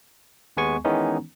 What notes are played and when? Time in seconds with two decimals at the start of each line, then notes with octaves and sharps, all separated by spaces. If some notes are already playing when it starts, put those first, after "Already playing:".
0.57 D#2 G#3 B3 G#5 C#6
0.85 D#3 E3 G#3 B3 C#4 D#4